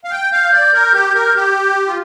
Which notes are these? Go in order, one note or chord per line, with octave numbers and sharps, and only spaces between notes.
F5
G5 G6
F5
D5
A#4
G4
A#4
G4
F4